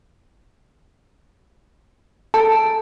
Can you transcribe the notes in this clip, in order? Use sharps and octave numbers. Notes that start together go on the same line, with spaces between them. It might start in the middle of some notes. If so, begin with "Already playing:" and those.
A4 A5